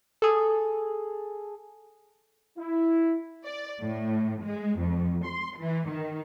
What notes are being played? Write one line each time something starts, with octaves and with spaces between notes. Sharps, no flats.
G#4 A4
E4
D5
A2
G#3
F2
C6
E3
D#3